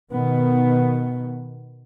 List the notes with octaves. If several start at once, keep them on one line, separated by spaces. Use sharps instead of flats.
B2 D#3 B3